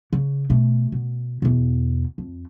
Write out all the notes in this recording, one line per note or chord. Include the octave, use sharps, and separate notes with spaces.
C#3
B2 A3
B2
E2 B2
F2